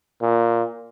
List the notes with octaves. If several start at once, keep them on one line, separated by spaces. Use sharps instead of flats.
A#2